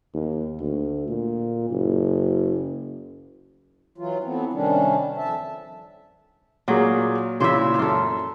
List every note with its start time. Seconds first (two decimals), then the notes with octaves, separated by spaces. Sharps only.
0.14 D#2
0.60 D2
1.09 A#2
1.70 F#1
3.98 E3 F#3 F4
4.24 E3 A3 B3 C4
4.53 C3 D#3 G3 C#4 D4
5.17 F2 E5 A5
6.68 A#2 F#3 A#3 G#4
7.40 A#2 C#3 E3 C5 E5
7.79 F#2 F4 A4